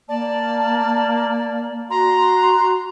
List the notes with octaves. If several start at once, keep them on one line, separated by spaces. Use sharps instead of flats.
A#3 D5 A5
F#4 A#5 C6